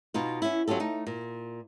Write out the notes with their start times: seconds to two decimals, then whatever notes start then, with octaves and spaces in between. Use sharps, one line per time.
0.14 B2 D#4 F4
0.42 C#4 E4
0.68 F#3 C#4 F4 G4 A4
0.80 A3 D#4
1.07 A#2